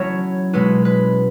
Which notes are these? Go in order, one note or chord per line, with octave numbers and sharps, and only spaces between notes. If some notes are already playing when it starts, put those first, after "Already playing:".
Already playing: F#3 A3 C#4 E4 C#5 E5
B2 G#3 C#4 E4 B4
B4